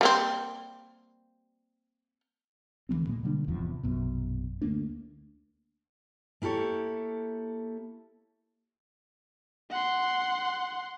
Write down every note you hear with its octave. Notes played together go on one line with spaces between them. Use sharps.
G3 A#3 C4
D2 E3 G3 C4
A#2 G#3 A#3
B2 D3 G3 D4
D1 E2 C3 F3
A#1 F#2 B2
D2 A3 A#3 D4
A#3 E4 G4 A4 C#5
F#5 C6